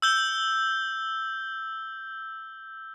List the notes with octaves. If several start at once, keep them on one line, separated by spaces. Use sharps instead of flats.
E6 G6 G7